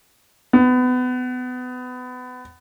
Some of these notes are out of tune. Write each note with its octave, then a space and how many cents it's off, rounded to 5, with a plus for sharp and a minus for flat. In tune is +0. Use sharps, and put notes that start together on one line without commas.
B3 +25